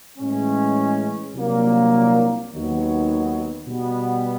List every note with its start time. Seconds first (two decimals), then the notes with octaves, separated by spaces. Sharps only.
0.17 A2 E3 G#3 C#4
1.34 C2 A#2 F#3 A#3 D4
2.50 D#2 D#3 F#3 B3
3.67 B2 G3 B3